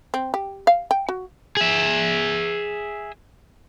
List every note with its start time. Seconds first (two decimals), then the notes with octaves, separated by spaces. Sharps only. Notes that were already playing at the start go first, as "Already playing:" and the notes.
0.14 C4
0.34 G4
0.67 F5
0.91 G5
1.09 F#4
1.57 G#4 E5